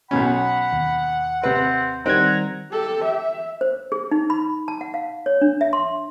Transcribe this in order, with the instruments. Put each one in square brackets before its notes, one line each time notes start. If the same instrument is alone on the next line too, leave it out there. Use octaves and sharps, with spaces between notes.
[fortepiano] B1 B2 C#4 [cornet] F#5 [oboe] B5
[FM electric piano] D#2
[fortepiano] C3 B4 [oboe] C4
[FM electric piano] D#3 G3 G#6 [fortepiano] C4 [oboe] F#5 [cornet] A#5
[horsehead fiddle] G4 A4
E5
[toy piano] C5
G#4
D#4
B5
A5
F#5
F5
C#5
D4
E5
C6